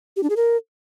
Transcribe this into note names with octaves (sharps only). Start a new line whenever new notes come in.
G4
D4
G#4
A#4